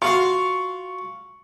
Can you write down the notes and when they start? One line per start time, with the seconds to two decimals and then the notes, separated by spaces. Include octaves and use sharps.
0.02 F4 F#4 F5 C#6